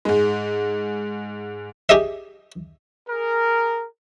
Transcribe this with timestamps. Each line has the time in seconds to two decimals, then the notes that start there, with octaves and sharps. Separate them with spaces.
0.05 G#2 G#3
1.89 G4 G#4 D#5 E5
3.08 G#4 A#4